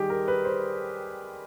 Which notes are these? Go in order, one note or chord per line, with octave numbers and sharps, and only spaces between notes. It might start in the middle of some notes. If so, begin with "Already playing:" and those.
Already playing: D#3 G3 G4 G#4
A#4
B4
C5